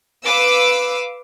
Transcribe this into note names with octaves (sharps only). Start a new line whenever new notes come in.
B4 F5 D6 E6